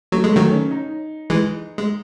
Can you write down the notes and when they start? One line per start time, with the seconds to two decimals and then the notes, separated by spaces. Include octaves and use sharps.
0.12 F#3 A3
0.24 G#3
0.31 D#3 F#3 A3
0.52 C#4
0.71 D#4
1.30 E3 G#3
1.78 G#3